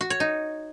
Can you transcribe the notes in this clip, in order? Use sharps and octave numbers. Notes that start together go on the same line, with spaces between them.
F#4
C#5
D#4